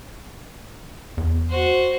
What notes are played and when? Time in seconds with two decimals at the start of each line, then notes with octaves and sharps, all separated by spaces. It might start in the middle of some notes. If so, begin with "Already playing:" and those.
1.17 E2
1.50 F#4 C5